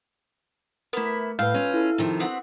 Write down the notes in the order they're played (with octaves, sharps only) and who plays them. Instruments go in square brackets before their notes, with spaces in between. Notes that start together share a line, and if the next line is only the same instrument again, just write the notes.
[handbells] A3 A#4 [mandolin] B3 E4
[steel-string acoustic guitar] A2 [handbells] B4 G6 [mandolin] F5
[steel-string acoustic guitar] C#4 F4
[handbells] E4 A4
[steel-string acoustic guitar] C3 D#3 F3
[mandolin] B3 C4 F#4